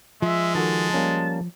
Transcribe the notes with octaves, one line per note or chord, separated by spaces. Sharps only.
F3 G#3 E5
D#3 F#4 A4 A5
G3 A#3 C#4